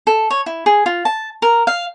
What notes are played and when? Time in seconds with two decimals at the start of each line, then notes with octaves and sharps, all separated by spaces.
0.07 A4
0.30 C#5
0.46 E4
0.66 G#4
0.86 F4
1.05 A5
1.42 A#4
1.67 F5